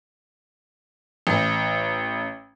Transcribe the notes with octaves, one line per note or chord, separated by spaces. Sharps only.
A1